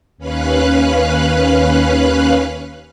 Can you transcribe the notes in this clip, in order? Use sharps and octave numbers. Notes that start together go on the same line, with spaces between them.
D#2 C#4 B4 F5 F#6